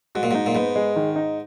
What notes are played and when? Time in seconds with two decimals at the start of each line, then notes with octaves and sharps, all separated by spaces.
0.15 G#2 F#4
0.23 A#2
0.31 G#2 D#4
0.46 A#2
0.55 G#2 B3
0.76 G#3
0.96 D#3
1.16 D#4